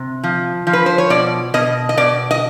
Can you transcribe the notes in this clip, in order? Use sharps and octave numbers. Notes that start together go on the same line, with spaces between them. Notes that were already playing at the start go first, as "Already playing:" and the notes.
Already playing: C3
F3
F3
B4
C5
C#5
B2 D5
B2 D#5
D#5
B2 D5
D#5